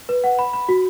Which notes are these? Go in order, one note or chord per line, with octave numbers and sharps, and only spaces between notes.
B4
F#5
B5
B5
F#4